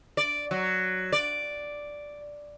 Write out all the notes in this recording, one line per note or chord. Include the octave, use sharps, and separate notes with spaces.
D5
F#3
D5